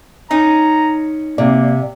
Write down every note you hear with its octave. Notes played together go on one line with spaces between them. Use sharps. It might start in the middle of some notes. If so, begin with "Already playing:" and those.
C#4 D#4 A#5
C3 A#3 D5